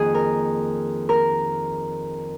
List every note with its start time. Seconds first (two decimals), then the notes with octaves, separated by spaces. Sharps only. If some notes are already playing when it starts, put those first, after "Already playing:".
Already playing: F2 D#3 A#3 G#4
0.14 A#4
1.09 A#4